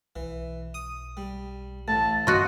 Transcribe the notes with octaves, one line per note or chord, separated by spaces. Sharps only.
B1 E3
D#6
G3
A1 A2 A5
G2 F4 F#4 D#5